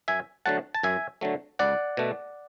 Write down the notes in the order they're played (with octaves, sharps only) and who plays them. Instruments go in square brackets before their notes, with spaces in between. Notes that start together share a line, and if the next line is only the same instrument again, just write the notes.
[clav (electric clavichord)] F#2 E5 G#5
D3 F#3 A3 F#5 A5
A5
F#2 E5 G#5
D3 F#3 A3
C#2 D5 F#5
B2 A3